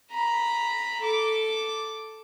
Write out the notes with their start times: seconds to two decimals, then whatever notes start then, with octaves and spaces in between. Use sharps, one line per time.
0.11 A#5 B5
1.01 A4 D6